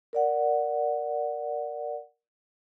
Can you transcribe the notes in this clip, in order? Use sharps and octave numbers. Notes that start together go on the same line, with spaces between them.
A#4 D5 F#5